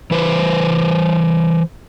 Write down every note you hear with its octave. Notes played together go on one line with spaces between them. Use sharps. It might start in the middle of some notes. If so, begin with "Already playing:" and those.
E3 B4 C5